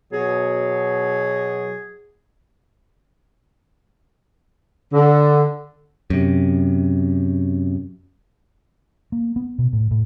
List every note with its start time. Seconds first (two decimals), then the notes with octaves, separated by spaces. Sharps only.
0.13 B2 F#3 G#4
4.93 D3
6.10 F#2 C3
9.12 A#3
9.36 B3
9.59 B2
9.73 A2
9.91 A2